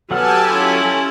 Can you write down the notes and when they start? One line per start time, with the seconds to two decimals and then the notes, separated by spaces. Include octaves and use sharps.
0.11 F#3 B3 G4 A4 F#5 G#5 A5 F6
0.45 C#4 E4 F4